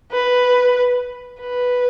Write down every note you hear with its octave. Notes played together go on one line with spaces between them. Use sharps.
B4
B4